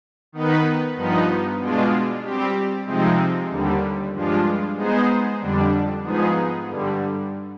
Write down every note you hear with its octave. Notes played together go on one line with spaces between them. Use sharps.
D#3 B3 D#4 B4
G2 F3 B3 D#4
B2 G#3 D4 F4
G3 C4 G4
C3 F3 G#3 C4 D#4
D#2 D3 G3
G2 F3 G#3 D4 F4
G#3 B3 D#4 G#4 C5
F2 D3 G3 D4
G#2 F3 B3 D#4 G#4
G2 D3 G3